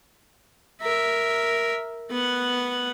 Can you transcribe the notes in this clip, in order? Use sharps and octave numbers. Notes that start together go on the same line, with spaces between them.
A#4 E5
B3 F#5